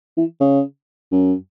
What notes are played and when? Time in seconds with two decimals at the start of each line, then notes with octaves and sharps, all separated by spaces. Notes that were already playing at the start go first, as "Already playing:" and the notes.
0.17 E3
0.40 C#3
1.12 F#2